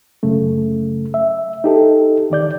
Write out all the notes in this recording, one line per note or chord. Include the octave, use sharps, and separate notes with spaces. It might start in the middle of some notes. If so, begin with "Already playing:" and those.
F#2 C#3 A3
E5
D#4 G4 A4
E2 D#3 D5 G6